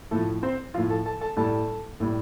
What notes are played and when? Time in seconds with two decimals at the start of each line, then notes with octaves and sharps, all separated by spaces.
0.11 A2 F3 A3 A4
0.43 C4 C5
0.74 F3 F4 F5
0.78 A2
0.90 A4 A5
1.05 A4 A5
1.21 A4 A5
1.37 A2 G3 A4 A5
2.00 A2 G3